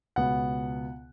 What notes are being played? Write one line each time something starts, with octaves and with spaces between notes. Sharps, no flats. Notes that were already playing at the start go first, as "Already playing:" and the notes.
C#2 B2 B3 F#5